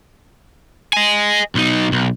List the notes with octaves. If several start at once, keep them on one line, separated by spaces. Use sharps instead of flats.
D#5 G#5
B1 D#4
B1